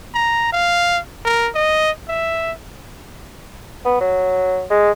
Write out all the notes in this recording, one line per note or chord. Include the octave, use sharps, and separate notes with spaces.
A#5
F5
A#4
D#5
E5
B3
F#3
G#3